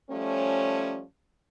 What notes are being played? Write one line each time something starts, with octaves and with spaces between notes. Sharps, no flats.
F3 G3 A3 C#4